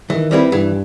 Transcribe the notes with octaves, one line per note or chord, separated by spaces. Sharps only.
D#3 E3
G3 C4 E4 B4
G2 E3